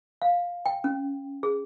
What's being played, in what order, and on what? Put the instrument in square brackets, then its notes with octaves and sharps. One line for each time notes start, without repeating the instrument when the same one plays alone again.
[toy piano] F5
G5
C#4
G#4